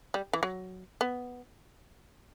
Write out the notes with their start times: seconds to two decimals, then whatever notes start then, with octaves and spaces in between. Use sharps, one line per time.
0.14 G3
0.33 E3
0.43 F#3
1.01 B3